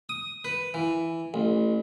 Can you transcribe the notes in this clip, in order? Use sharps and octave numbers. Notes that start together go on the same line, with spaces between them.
D#6
B4
E3
A1